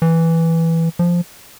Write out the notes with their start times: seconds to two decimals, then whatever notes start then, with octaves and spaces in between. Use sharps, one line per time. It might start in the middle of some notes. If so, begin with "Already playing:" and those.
0.02 E3
0.99 F3